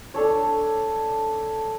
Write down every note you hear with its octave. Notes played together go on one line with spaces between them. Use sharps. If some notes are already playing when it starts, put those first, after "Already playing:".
D4 A4 C#5